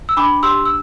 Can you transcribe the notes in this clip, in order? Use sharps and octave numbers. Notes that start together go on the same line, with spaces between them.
E6
D4 B5 D6
G4 C6 E6
E6